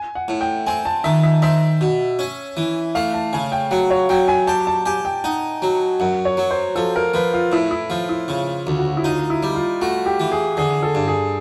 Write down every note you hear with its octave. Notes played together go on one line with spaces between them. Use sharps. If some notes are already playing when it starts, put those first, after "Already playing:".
Already playing: G#5
F#5
A2
G5
C4 G#5
A5
D#3 E5
E5
C4 E5
B2
C#4
E3
A3 F5
A5
C#3 G#5
G5
F#3 F#5
C#5
F#3 G5
G#5
G4 A5
A5
G4 G#5
G5
D#4 F#5
F#3
F#2 F#5
C#5
F#3
C5
F3 A4
A#4
F3 B4
F4
A2 E4
E4
F3 F4
E4
C#3 F4
D2
F#4
E4
D#4 F4
E4
G3
F4
A3 F#4
G4
E3
G#4
D3 G#4
A4
G2
G#4